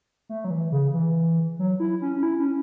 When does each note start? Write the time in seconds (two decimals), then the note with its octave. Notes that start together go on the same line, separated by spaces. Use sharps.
0.29 A3
0.45 F#3
0.50 E3
0.72 C#3
0.94 E3
1.59 F#3
1.80 E4
2.02 C#4
2.16 C#4
2.23 E4
2.39 C#4